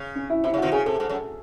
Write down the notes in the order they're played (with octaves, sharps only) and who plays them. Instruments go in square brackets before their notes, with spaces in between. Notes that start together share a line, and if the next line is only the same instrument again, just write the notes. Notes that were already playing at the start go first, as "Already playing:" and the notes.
Already playing: [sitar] C#3
[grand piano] C#4
E4
[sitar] C3 [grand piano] E4
[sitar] C#3
[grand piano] F#4
[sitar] C3 D#3
[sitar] C#3 [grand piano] G#4
[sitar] C3 [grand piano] A4
[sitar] G#2
F#2